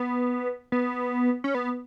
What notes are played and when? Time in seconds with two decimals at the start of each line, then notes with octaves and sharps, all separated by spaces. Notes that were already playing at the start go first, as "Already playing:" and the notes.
Already playing: B3
0.72 B3
1.44 C#4
1.55 B3